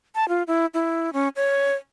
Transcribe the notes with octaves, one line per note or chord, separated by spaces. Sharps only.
A5
F4
E4
E4
C#4
C#5